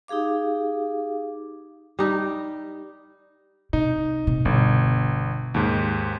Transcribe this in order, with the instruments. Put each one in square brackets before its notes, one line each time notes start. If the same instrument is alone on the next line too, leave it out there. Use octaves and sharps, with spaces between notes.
[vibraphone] D#4 G4 G#4 F5 D6
[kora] G3 D#4
[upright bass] C3 [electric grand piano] D#4
[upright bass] C3
[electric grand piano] G1 [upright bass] B2
[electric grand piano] D#2 G#2